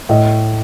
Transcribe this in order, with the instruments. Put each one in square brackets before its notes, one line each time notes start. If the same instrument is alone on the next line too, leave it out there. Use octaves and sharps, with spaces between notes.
[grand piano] A2 D#5